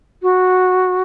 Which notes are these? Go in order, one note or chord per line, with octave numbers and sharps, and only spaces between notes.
F#4